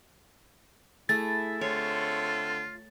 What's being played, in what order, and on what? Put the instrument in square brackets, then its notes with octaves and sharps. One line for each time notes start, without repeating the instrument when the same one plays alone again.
[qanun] A3 G#4 [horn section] E4 [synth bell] A6
[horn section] D3 A3 C4 [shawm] F4 [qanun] C#5